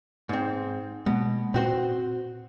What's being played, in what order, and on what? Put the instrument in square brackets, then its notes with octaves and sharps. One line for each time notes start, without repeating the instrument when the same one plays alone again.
[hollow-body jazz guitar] G#2 C4
[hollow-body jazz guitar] B2 [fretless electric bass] G#3 A#3
[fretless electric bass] A#2 [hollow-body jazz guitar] C4 F#4 C5